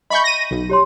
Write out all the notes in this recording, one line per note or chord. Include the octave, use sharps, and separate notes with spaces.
D#5 E5 G#5 B5 C#6 G6
A#6 D#7
B1
G4 C#5 C6